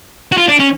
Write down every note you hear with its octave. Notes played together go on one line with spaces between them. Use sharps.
F#4
F4
D4
C#4